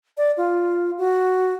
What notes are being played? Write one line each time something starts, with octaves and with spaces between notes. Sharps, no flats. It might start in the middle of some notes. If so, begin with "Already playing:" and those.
D5
F4
F#4